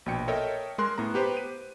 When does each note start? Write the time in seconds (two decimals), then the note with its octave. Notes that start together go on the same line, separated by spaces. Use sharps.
0.06 A#1 B2 G5 C#7
0.28 A4 A#4 C#5 D#5 E5 G5
0.78 G#3 A#4 C6 F#6
0.98 A2 B3 A#5
1.14 B3 G4 B4 C5
1.37 D#7